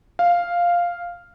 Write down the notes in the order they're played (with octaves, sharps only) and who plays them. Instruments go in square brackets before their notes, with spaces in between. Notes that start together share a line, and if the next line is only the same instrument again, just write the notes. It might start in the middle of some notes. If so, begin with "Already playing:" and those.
[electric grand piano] F5